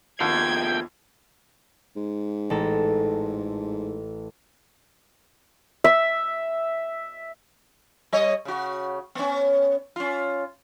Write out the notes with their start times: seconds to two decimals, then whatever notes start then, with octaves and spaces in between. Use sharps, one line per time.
0.20 D#2 B2 F3 F#5 G5 A5 G#6
1.96 G#2
2.50 A1 A4 A#5
5.84 E5
8.12 G3 C#5 D#5
8.45 C#3 F#4
9.15 B3 C#4
9.96 C#4 F4